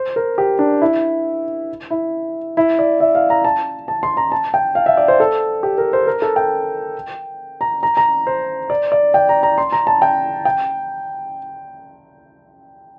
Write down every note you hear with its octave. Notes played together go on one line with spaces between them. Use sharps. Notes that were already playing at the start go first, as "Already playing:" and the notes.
Already playing: C5
A#4
G4
D4
E4
E4
E4
D5
E5
F5
A#5
A5
A5
C6
A#5
A5
G5
F5
E5
D5
C5
A4
G4
A#4
C5
A#4
A4
G5
A#5
A#5
A#5
C5
D5
D5
G5
A#5
A#5
C6
A#5
A5
G5
G5